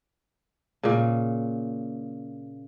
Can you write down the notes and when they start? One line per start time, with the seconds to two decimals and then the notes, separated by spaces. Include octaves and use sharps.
0.83 A#2 C#3